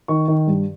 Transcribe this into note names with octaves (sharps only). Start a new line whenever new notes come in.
D#3 C#6
D#3
G2